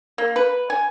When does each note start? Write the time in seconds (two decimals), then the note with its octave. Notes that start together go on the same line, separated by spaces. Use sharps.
0.18 A#3
0.36 B4
0.70 G#5